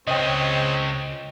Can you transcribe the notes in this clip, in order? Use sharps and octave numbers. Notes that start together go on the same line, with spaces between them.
C#2 C4 C#5 D#5 G5